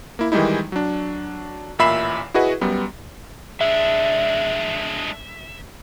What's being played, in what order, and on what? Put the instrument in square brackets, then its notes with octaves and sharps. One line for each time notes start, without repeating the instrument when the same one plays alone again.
[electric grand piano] A#3 E4
D#3 E3 G3 G#3 D#4 E4
F#3 D4
A1 A#2 E5 B5 C7 E7
E4 F#4 G#4 B4 D#5 F#5
F#2 G3 B3
[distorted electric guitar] G#3 D4 [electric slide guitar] E5